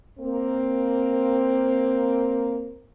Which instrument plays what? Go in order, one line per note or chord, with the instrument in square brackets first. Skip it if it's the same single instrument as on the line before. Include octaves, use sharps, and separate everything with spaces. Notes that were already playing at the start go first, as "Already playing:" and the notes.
[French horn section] A#3 C4